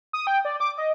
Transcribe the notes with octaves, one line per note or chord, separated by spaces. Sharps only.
D#6
G5
D5
D6
D#5